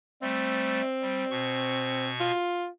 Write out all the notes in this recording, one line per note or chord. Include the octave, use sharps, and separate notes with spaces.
G3 A3 C4
G3
B2 C#6
F4